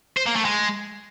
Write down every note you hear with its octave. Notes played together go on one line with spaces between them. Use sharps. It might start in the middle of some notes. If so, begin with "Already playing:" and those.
C5
A#3
A3
G#3